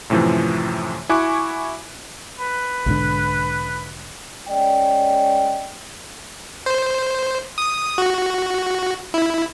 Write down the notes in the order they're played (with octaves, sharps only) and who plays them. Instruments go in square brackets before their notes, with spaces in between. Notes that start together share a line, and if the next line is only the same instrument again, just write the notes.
[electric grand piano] F#2 A2 C3 E3 F3
E4 F#4 G#5 C#6 D6 F#6
[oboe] B4
[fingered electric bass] B1 G#2 D3
[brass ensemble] G#3 C#4 D5 D#5 G5
[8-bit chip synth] C5
D#6
F#4
E4